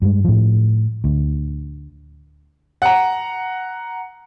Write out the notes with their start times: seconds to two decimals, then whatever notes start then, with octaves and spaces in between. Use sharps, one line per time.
0.02 G2 G#3
0.24 A2 F3
1.04 D2
2.82 F#5 A#5